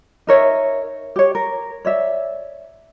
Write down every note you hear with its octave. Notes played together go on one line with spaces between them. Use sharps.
D#4 A#4 C#5 E5
G4 C#5
A#4
C#5 D5 E5